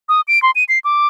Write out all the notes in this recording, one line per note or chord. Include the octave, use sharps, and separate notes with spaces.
D#6
D7
C6
D#7
C7
D6